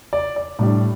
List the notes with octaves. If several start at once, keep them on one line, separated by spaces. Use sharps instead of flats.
D5
D5
A2 G3 D4